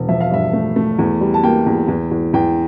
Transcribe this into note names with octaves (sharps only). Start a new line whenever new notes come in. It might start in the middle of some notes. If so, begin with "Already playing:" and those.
Already playing: E1
F3 E5
F5
G2 E5
A3
A3
E2
G3
A5
A#3 G5
E2
E2
E2
E2 G5